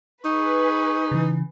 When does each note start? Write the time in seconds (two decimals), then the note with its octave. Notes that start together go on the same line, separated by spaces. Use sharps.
0.25 D#4 G#4 B4 C#6
1.11 C#3 E3